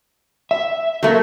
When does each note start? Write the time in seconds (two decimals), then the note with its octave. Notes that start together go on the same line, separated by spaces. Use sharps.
0.51 E5
1.03 F#3 A3 A#3